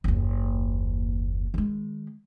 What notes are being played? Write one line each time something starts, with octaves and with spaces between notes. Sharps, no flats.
F#1 D#2
D#3 G#3